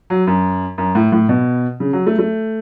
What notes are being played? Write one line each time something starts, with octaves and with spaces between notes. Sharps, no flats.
F#3
F#2
F#2
A2
A2
B2
C#3
F#3
A3
A3